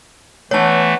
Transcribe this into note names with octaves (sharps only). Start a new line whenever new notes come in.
E3 A3 B3 D4 F#4 C#5 A5